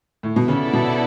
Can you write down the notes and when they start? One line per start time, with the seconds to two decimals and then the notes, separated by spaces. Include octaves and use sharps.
0.23 A2
0.36 B2
0.48 C#3 B3 E4 A4 D5
0.73 B2